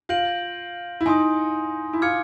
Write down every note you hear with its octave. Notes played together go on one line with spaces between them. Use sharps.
F4 G6 A#6 D7 F#7
E4
D#4 G#5 C6 D#6
E4
F4 D6 F6 G#6 C#7